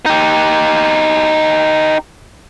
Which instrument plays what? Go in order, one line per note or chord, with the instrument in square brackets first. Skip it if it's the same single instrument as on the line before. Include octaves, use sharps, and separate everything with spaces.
[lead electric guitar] D#4 G4